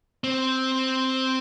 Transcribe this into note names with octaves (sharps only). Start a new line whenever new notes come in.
C4